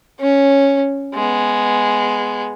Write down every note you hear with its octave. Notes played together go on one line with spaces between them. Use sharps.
C#4
G#3 B3